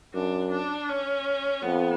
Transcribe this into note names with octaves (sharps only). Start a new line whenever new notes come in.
F#2 D4
D4
C#4
F2 B3